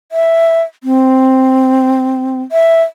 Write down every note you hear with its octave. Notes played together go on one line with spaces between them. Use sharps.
E5
C4
E5